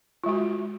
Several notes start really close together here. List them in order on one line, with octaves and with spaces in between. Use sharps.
F4 G#3 F#4